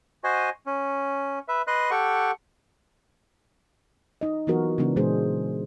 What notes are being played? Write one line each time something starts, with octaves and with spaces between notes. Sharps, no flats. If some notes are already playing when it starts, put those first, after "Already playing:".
F#4 C5 D#5 G#5
C#4
B4 E5
B4 D#5 C6 F#6
G4 A4 F#5 C#6
D#4 D#5
E3 F#3 B3 F4 F#4 A#4
C#3 E3 G#3 B3 D4
A#2 E3 G#3 D4 G#4 C5